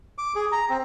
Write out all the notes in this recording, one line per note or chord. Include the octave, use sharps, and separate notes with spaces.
D6
G#4
A#5
C4